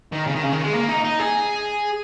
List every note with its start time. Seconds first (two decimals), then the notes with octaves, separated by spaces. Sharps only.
0.12 D#3
0.27 C#3
0.35 D#3
0.43 C#3
0.53 D#3
0.64 G#3
0.74 A#3
0.89 D#4
1.05 D#4
1.20 G#4